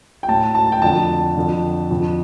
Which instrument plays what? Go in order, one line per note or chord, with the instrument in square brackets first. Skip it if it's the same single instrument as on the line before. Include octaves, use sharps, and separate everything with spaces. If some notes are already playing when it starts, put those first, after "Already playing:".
[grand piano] G5
A2 A5
A5
G5
F2 D3 A5
F2 D3
F2 D3